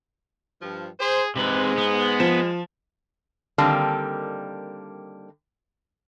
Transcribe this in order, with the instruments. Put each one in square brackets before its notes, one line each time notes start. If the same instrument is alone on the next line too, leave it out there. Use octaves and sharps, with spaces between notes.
[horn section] G2 F3
[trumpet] G#4 [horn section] C5
[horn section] G#2 [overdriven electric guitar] C3 B4 [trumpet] G#3
[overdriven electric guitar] B3
[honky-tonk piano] F3 E7
[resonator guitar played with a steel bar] D3 D#3 G3 A#3 C4 A5